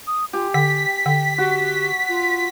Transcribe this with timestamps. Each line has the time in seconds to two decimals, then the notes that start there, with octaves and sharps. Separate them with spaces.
0.07 D#6
0.33 F4 G4 G#5
0.54 D3 G5 B6
1.06 D3 G5
1.38 F#4 G4
2.09 F4